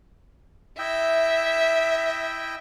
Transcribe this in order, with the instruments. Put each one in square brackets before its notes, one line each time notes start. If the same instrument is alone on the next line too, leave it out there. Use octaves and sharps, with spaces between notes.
[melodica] E4 D#5 G5 [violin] E5